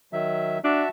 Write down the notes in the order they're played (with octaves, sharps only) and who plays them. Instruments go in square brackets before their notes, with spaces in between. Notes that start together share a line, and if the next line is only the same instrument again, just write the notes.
[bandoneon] D#3 F#3 E5
[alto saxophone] D4 [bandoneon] F#4 E5 A5